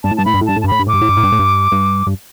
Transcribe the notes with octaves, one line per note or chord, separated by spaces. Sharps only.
G2 A5
A2
G2 A5
A2 B5
G2
A2
G2 A5
A2
A5
G2
A2 B5
G2
A2 D6
G2
A2
G2
A2
G2
A2
G2
G2
G2